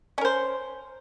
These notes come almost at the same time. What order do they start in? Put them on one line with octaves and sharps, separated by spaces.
C#4 A#4 C5